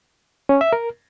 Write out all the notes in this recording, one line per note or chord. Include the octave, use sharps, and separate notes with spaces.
C#4
E5
A#4